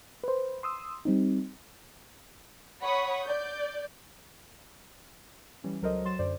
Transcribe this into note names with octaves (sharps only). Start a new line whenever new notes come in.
B4 C5
C6 D#6 E6
G3 C4 D#4
C#5 F#5 B5 C#6 D#6
D5 G6
E3 G3 C#4
C#2 F#3 A4 A#4 C5 D#5
F#3 C6 A6 E7
F#2 D3 C5 D5